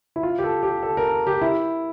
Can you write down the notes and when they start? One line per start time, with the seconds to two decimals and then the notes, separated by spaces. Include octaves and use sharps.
0.16 E4
0.23 F4
0.38 G4
0.43 A4
0.63 G4
0.83 A4
0.97 A#4
1.27 G4
1.41 E4